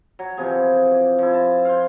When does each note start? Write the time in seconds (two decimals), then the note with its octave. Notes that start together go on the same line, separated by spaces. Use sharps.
0.19 F#3
0.37 C3 E3 F3 G#4
0.92 D6
1.19 F3 E4
1.34 A5
1.65 C5 F5